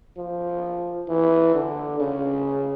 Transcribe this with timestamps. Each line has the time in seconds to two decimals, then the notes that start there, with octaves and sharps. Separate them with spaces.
0.18 F3
1.09 E3
1.55 D3
2.00 C#3